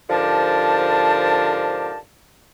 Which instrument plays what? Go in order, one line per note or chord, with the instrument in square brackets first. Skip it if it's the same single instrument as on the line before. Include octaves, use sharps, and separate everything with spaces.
[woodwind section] G#2 D3 F3 G4 A#4 A5